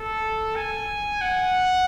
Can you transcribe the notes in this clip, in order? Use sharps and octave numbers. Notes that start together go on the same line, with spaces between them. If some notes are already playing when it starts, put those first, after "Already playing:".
Already playing: A4
G#5
F#5